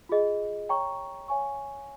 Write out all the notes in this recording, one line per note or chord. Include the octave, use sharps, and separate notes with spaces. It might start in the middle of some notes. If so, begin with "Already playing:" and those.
F4 G#4 D#5
C#5 G5 A#5 C#6
C#5 F5 G#5 C#6